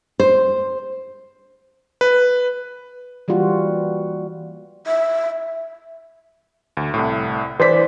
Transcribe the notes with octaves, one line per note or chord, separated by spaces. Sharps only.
C5
B4
E3 G3 A#3 F4 F#4
E5
D2
C2 A2
E3 C5 D5 B6